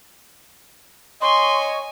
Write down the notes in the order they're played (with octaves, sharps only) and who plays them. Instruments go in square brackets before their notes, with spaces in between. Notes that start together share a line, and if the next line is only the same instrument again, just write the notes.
[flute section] C#5 C#6 [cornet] D#5 [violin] G#5 [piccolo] C6